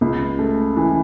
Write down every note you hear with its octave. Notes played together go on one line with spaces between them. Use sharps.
C#2
A3
E3